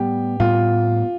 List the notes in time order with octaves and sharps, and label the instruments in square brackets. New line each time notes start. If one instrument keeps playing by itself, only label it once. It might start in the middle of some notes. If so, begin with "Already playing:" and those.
Already playing: [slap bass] A2 G3 B3 [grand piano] G4
[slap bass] A2 G3 B3 [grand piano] F4